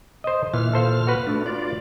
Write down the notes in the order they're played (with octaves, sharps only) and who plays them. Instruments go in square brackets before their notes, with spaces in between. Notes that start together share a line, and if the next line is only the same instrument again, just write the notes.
[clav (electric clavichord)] C5 D#5
[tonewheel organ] A#2 F6 [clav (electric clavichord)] E3
[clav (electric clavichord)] A4 C5 F5
F#4 B4
[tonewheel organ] A3 D4
F4 D5